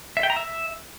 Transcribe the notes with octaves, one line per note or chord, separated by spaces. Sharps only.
E5
G5
A#5
E5